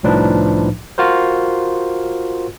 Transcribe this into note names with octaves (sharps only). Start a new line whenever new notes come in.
C2 A2 F3 D4 D#4 B4
F4 F#4 A#4 C5